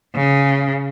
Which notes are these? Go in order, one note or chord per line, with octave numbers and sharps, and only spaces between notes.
C#3